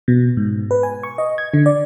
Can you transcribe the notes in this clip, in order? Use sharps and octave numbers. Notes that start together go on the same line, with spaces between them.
B2
G#2
B4
G#5
C#6
D#5
G#6
D3
D5